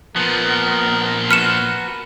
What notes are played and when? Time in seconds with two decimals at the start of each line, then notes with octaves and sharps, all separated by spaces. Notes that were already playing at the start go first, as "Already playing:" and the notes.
0.16 A#2 F3 B3 A#4
1.31 F#4 B4 F6 C#7 E7